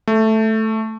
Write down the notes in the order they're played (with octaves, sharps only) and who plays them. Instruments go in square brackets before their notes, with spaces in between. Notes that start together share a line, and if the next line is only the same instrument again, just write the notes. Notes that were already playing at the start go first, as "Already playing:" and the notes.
[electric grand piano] A3